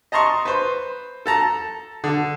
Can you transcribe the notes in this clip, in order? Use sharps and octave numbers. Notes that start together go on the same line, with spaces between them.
D#5 A5 A#5 C6 C#6
B4 C5
A4 A5 A#5
D3